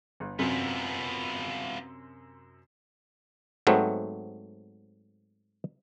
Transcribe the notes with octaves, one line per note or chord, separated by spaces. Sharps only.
G1
F#2 C3 B3 C4 F4
G#2 F#3 A3 B3 C4